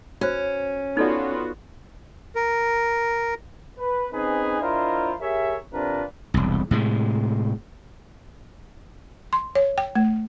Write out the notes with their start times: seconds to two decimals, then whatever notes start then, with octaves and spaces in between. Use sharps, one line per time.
0.21 C#4 F#4 C5
0.97 B3 D#4 F4 F#4 A4 D5
2.35 A#4
3.78 B4
4.13 C4 C#4 D#4 G#4 B4
4.61 D4 E4 F4 A#4 C5 D#5
5.20 G4 G#4 A#4 C#5 E5
5.73 C3 C4 D4 F4 A#4 B4
6.34 E1 C2
6.71 A2 C3 G#3
9.33 C6
9.55 C#5
9.78 G5
9.95 A3